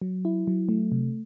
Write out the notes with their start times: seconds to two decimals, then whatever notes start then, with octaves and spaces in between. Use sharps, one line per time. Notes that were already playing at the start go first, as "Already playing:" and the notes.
0.02 F#3
0.25 E4
0.47 F#3
0.69 A3
0.92 C3